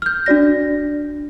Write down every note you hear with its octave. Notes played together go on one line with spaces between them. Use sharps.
F6 G6
D4 F#4 D5 A#6